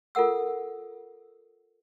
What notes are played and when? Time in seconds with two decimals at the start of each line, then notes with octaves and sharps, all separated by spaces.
0.15 F4 A4 A#4 F#5 E6